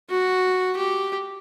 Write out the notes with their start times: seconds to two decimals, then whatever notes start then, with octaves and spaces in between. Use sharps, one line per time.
0.10 F#4
0.77 G4